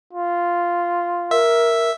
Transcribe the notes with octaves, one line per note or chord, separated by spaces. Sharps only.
F4
A#4 E5